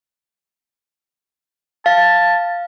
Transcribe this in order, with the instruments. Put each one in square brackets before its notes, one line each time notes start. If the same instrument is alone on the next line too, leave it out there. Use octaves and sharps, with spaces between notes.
[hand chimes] F5 [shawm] A5